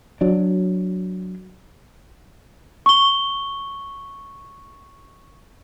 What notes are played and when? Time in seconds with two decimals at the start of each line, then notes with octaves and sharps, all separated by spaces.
0.21 F#3 D4
2.86 C#6 G7